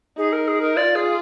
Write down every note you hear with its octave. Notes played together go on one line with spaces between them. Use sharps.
D#4 G#4
A#4
G#4
A#4
F4 D5
G#4